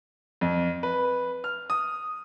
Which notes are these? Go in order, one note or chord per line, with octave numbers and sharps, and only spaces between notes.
F2
B4
F6
D#6